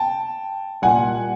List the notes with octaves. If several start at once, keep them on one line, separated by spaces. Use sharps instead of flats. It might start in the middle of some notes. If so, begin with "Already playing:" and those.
Already playing: G5 A5
A#2 G3 F#5 G#5